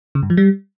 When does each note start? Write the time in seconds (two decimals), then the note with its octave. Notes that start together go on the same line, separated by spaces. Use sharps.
0.15 C#3
0.23 G2
0.30 F3
0.37 G3